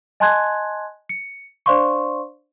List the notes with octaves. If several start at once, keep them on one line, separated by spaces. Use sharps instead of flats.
D#5 G#5 A5 C6 F#6 G#6
C#7
D4 C5 D5 F5 C6 C#6